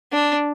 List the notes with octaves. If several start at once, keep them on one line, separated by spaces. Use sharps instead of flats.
D4